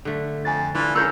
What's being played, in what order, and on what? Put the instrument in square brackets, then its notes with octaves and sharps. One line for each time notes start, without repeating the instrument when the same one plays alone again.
[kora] D3 A3
[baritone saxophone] F2 [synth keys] G#5 A6
[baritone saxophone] E3 [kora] D4 F4
[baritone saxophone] C#2 [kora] C#4 A#4 F5 [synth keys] E6 G6